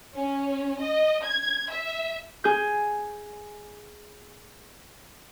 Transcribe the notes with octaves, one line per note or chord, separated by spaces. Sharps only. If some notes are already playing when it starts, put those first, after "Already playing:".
C#4
D#5
G#6
E5
G#4 G6